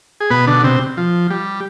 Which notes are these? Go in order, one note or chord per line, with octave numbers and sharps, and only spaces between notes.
G#4
B2 B3 B4
D3 D4
C3 C4
F3
G3